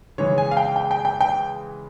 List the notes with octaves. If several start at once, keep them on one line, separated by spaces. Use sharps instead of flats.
C#3 E3 G#3 C#5
G#5
F5
G5
G5
G5
G5
G5